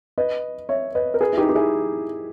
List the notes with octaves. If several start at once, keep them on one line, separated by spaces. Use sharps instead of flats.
B4 D#5
C#5 E5
B4 D#5
A#4
G#4 B4
E4
D#4 G4
G4
E4 G#4